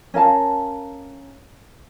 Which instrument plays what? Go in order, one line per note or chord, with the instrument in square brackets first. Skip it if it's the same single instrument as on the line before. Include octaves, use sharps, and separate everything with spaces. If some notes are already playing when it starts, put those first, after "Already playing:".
[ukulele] C#4 A#4 F5 A5